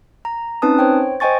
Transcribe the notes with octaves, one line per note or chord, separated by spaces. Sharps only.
A#5
C4 C#4 D#4 B4 A5 D#6
C5 C#5 G5
C5 D#5 G5 G#5 C#6 A6